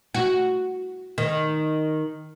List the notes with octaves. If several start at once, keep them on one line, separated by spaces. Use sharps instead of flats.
F#4
D#3